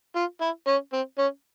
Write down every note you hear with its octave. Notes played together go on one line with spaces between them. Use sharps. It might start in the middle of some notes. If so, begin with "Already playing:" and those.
F4
E4
C#4
C4
C#4